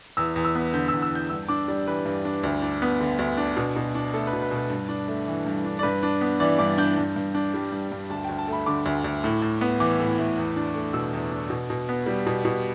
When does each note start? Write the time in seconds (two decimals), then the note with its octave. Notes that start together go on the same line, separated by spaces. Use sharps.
0.17 E2 E6
0.36 E2
0.45 E6
0.55 B3
0.73 D3 G6
0.88 E2 E6
1.02 E6
1.11 E2 G6
1.30 G2 E6
1.48 D4 D6
1.68 G3 D5
1.86 E3 B4
2.06 G2
2.25 D4
2.44 D2
2.62 D4
2.82 B3
3.01 D3
3.19 D2
3.37 D4
3.57 B2
3.76 B2
3.95 D4
4.13 A3 A4
4.27 B4
4.33 B2
4.42 B4
4.51 B2
4.56 B4
4.70 G2
4.89 D4
5.08 A3
5.27 E3
5.46 G2
5.65 D4
5.79 D5
5.83 G2 B4
6.03 D4
6.21 B3
6.40 E3 D5
6.59 G2 D6
6.78 D4 G6
6.97 G2
7.16 G2
7.34 D4
7.54 G3
7.72 G2
7.92 G2
8.10 D2 A5
8.24 D2 G5
8.38 A5
8.48 A3 B5
8.66 D3 D6
8.86 D2
9.04 D2
9.24 A2
9.42 A2
9.61 B3
9.80 E3 D6
10.00 A2
10.19 A2
10.38 E2
10.56 D4
10.75 A3
10.93 B2 E6
11.13 E2
11.31 D4
11.50 B2
11.70 B2
11.89 B3
12.06 G3
12.27 B2
12.45 B2